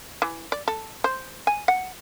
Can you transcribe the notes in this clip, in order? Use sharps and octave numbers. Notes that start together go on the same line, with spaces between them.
E3
D5
A4
C5
G#5
F#5